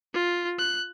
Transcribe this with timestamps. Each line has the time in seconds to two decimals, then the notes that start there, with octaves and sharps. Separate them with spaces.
0.14 F4
0.59 F#6